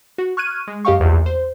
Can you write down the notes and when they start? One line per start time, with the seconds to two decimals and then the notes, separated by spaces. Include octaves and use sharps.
0.18 F#4
0.37 C#6 F6 F#6 G#6 D#7
0.67 G#3
0.85 F#2 G4 D#5 F5 G5 C#6
1.00 A#1 E2
1.26 C5